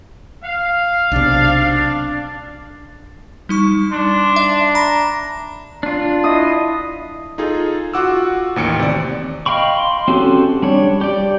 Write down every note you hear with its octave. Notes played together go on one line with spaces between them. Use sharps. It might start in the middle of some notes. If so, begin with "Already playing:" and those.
F5
B1 C3 D4
G3 D#4 C#6
D4 C6
E5
A#5 B5
D4 F4
E4 D#5 D#6
D#4 F4 G#4 A4
F4 F#4 F#5 D6 E6
A1 D#2 C#7 D7
C3 D5
D#5 F5 G5 B5 C#6
C6
C4 C#4 F#4 G4 A4
G3 D4 C#5
G4 D5